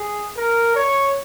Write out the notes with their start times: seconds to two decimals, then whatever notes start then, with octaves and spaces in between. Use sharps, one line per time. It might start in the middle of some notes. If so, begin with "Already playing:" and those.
Already playing: G#4
0.37 A#4
0.76 C#5